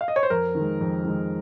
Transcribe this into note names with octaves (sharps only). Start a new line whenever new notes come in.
F5
D#5
C#5
C5
F2 A#4
D#3
G#3
F2
D#3 G#3